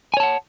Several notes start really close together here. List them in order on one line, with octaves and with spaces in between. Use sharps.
G#5 C#5 A5 F#5